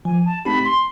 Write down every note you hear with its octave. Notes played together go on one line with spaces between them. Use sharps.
F3 G#5
A5
A3 C4 D#4 G4 B5
C6